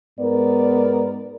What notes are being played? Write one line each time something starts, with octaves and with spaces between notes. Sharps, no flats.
G#2 B3 A#4 D5